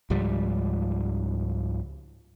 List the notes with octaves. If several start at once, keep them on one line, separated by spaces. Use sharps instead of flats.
C#2 G#2 F3 G3